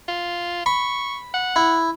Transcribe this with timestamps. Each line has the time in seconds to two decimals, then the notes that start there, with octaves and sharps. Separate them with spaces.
0.08 F4
0.66 B5 C#6
1.34 F#5
1.56 E4